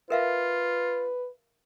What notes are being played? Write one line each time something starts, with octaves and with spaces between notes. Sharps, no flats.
F4 A#4 B4 E5 F5